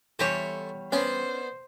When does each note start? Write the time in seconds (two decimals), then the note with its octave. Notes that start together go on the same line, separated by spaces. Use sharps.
0.19 E2 G3 A4 C5 C#5 G#5
0.92 B3 C#4 D4 C5 D5